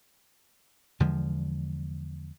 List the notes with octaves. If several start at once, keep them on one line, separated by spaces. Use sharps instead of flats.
E2 D3 F3 G#3